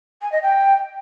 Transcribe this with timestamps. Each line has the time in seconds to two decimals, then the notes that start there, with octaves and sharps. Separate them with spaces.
0.22 G#5
0.32 D#5
0.42 G5